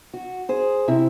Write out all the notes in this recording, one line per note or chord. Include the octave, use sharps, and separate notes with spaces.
F#4
G#4 C5
C3 E4